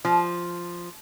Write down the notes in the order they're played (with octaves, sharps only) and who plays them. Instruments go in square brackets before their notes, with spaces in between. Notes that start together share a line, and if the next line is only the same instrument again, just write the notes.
[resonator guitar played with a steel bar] F3